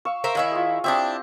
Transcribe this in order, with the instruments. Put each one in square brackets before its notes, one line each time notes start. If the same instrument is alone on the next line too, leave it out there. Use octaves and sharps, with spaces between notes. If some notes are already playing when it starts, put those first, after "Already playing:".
[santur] F5 C#6 E6
[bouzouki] A#4 C5 E5
[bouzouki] D#3 E4 E5 [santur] C#5 F5 G#5
[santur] F4 G#4
[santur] C4 G4 D#5 [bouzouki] D4 E4 E5